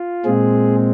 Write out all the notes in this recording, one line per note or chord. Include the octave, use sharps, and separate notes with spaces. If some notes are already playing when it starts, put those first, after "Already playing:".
Already playing: F4
A#2 G#3 C4 G#4